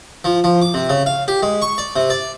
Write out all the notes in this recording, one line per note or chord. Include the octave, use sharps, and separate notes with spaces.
F3
F3
D6
C3
C#3
F5
G4
G#3
C#6
D5
C3
D5